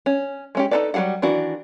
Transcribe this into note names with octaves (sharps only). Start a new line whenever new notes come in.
C#4
G#3 C#4 G4
D#4 F#4 A4 B4 D5
F#3 G3 G#4 A4 F#5
D#3 E3 D4 F#4